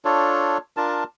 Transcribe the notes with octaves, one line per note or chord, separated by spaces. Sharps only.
D4 F4 A4 C#5
D4 F4 A#4 A5